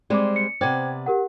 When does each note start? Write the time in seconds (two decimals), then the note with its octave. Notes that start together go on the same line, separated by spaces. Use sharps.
0.10 G3 G#3 C4 D5 D6
0.36 C#7
0.61 C3 B3 C5 D5 G5 G#6
1.06 G4 A#4 F#5